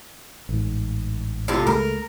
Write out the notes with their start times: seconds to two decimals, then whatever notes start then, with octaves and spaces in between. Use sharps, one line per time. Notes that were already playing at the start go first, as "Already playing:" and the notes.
0.49 A1 G#2
1.48 A2 C3 F4
1.67 C#2 G#3 A3 A#4